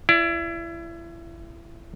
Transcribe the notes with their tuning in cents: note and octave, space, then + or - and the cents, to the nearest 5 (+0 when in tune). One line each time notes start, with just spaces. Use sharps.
E4 +30 D5 +0